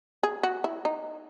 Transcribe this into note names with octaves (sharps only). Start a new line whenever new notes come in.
G#4
F#4
E4
D#4